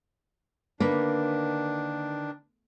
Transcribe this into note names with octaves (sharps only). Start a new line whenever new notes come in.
D3 D#3 A#3 D4 B4